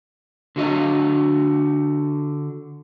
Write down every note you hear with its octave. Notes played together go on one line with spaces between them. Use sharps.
D3 F#4 D#5 E5